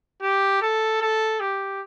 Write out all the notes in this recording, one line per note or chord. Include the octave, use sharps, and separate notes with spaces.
G4
A4
A4
G4